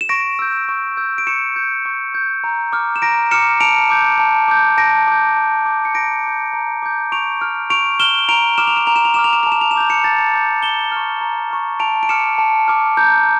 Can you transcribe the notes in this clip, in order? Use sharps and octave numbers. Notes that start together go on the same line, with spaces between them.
E7
C#6 A#6 D7
E6 G6
C#6
E6 G6
D7
C#6 C#7 E7
G6
C#6
G6
A#5
D6 F6
E7
A#5 A#6 D7
D6 F6 C#7 E7
A5 D7 F7
D6 G6
A5
D6 G6
A5 A#6 D7
D6 G6
A5
D6 G6
C#7
A#5 A#6 D7
D6 G6
A#5
D6 G6
C#6 D7 F7
F6
C#6 D7 F7
F6 E7 G7
A#5 D7 F7
D6 F6 E7
F7
E7
A#5 F7
E7
F7
D6 F6 E7
F7
E7
A5 F7
E7
F7
E7
D6 G6 F7
C#7 E7
A5 A6
D6 G6
A#5 E7 G7
C#6 F6
A#5
C#6 F6
A5 D7 F7
D7
D6 F6 C#7 E7
A5
D6 F6
A#5 G6